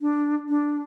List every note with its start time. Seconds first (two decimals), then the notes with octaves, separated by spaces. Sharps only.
0.01 D4
0.49 D4